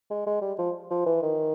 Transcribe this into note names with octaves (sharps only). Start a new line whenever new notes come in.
G#3
G#3
G3
F3
F3
E3
D#3